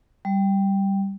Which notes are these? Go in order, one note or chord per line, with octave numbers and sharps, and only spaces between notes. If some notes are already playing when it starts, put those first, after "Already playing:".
G3